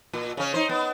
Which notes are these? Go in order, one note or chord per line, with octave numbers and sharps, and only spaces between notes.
A#2
C#3 C#4
D#4 C5
B3